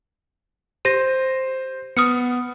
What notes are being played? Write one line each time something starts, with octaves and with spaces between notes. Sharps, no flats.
G4 C5 A#6
B3 D#6 F6 C#7